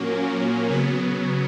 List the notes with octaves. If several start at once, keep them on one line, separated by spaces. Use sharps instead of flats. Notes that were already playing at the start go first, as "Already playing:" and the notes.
Already playing: A#2 F#3 A#3 C#4
C#3 F#3 B3